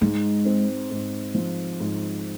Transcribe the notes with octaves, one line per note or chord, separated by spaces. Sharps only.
G#2 G#3
C4
G#2
F3
G#2